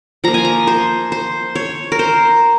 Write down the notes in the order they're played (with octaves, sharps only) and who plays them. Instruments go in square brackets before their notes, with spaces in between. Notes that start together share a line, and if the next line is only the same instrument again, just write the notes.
[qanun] F3 A#3 A#5
G#5
A#5
C5
C5
C#5
A#4
C5